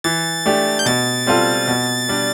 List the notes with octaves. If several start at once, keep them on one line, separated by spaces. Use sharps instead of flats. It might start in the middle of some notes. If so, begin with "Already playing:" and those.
E3 A6
A3 D4 G4
G6
B2 A6
G3 C4 F4 A4
B2
G3 D4